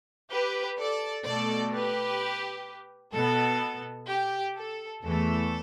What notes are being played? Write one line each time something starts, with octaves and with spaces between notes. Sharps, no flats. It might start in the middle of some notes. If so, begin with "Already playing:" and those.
G4 B4
A4 D5
B2 A3 A4 D5
G4 B4
B2 B3 A4
G4
A4
E2 E3 A3 A4